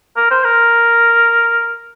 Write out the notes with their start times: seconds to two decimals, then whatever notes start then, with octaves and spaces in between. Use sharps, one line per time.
0.17 A#4
0.31 C5
0.44 A#4